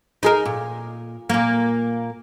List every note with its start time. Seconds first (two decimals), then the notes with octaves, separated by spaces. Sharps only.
0.23 D#4 G#4 A#4
0.46 A#2
1.29 A#2 A#3